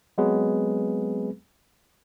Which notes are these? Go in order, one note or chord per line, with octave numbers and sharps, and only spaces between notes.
F#3 G#3 B3 C4 G#4 B4